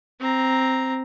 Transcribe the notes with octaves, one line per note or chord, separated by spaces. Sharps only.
C4 A#5